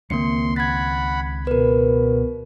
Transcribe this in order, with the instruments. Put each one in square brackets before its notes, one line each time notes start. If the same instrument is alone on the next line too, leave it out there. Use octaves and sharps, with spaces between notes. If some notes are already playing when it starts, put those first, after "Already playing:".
[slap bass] C#2 D#3 C4 [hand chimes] A#3 C#7 [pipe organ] C6
[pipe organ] F#5 B5 [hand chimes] G#6 A6
[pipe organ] B2 [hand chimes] A#4 B4